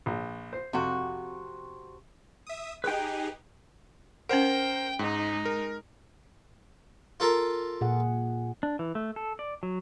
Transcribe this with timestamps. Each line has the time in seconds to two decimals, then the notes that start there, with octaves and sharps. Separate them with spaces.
0.06 A#1
0.53 C5
0.73 F2 C3 F#4
2.47 E5 D#6
2.84 D#4 G4 G#4 B4 G5
4.29 C#4 A#4 C5 F#5 G5
4.99 G#2 G#3 D#4
5.45 A#4
7.20 F4 A4 A#4
7.81 A#2 G#4 F#5
8.63 D4
8.79 E3
8.95 A3
9.16 A4
9.39 D5
9.63 F#3